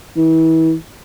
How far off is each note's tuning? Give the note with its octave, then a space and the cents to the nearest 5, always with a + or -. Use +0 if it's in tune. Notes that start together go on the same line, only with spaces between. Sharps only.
E3 -35